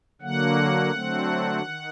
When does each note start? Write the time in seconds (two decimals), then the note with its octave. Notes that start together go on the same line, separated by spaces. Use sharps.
0.22 D3 F#3 A#3 F#5
0.92 D3 F#3 A3 C4
1.61 D#3